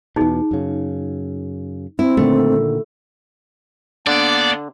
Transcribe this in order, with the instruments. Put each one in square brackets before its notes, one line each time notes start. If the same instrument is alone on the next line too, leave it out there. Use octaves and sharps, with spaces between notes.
[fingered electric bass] E2 B2 [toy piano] D#4 G#4
[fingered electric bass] F#2 C#3
[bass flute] C4 [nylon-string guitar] E4
[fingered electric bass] A#2 D3 D#3 [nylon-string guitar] A3
[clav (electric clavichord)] D3 [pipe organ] A#3 B3 D4 [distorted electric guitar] D5